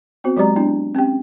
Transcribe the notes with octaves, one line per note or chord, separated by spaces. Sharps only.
B3 C4 F#4 C5
F#3 G#3 G4 D5 A#5
B3 D4 E4
C4 C#4 G4 G5